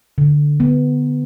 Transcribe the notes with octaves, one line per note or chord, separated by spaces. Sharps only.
D3
B3